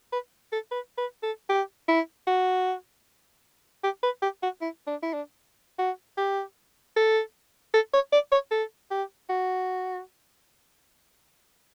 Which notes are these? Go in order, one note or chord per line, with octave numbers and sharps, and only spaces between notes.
B4
A4
B4
B4
A4
G4
E4
F#4
G4
B4
G4
F#4
E4
D4
E4
D4
F#4
G4
A4
A4
C#5
D5
C#5
A4
G4
F#4